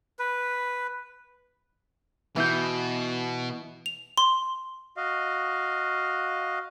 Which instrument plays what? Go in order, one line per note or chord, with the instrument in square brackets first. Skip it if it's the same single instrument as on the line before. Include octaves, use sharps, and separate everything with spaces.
[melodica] B4
[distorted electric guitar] B2 [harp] E3 E4 G6
[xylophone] F7
C6
[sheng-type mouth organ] F#4 D#5 F5